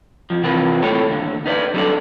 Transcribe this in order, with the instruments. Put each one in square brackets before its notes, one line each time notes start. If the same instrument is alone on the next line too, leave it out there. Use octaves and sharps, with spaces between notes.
[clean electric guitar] F2 F3
C3 E3 C4 F4 A#4 B4
A2 G3 A3 G4 A4 C#5
D#2 D3
D#4 B4 C5 D5
F#3 G3 B3 D4 A4 D5